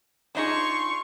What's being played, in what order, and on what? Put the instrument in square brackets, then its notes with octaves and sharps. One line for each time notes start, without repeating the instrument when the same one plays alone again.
[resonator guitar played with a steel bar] D4 D#4 G#4 [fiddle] F4 C6 [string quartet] C#6